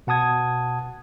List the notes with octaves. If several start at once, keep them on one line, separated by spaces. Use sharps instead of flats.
B2 F#5 A5 D#6 G#6